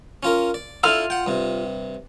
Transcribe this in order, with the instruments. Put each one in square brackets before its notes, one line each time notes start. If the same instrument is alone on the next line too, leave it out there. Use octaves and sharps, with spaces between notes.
[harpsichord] C#4 F4 A#4
D5
[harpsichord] D4 E4 A4 [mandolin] F4 F6
[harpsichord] F#5 G5
G2 C3